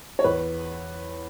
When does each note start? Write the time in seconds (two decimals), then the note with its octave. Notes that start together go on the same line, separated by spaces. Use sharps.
0.19 C#5
0.24 E2 B4